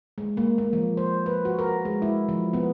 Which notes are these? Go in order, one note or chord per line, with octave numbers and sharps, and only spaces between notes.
G#3
A#3
A#3
F3
C5
B4
F#4
A#4
G#3
E4
F3
B3